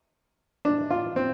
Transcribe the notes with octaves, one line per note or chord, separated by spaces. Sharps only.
D4
F4
C4